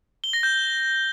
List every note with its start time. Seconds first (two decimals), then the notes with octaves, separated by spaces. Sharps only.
0.24 G7
0.33 A#6
0.43 G6